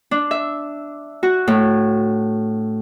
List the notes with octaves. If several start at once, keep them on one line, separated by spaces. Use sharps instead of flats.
D4
E5
F#4
A2